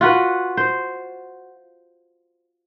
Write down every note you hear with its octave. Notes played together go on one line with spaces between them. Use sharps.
F4 F#4 B4
C5